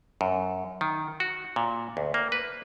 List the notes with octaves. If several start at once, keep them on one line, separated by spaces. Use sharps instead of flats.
F#2
D#3
F#4
A#2
D2
A#3
B4